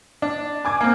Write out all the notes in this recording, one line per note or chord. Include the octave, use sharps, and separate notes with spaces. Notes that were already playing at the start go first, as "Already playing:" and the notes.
D4
G#5 D6 G#6
A#3 C4